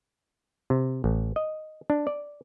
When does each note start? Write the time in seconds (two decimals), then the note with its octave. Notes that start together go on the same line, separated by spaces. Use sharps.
0.70 C3
1.04 A1
1.36 D#5
1.90 D4
2.07 D5